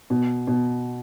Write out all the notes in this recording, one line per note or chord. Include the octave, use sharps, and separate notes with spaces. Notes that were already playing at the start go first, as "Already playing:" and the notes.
B2
B2